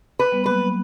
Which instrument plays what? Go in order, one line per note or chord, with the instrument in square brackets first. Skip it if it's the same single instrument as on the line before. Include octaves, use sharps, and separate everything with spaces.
[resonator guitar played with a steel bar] B4
[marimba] G3 B3
[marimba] F#3 A#3 [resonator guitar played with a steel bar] B4
[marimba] F#3 A#3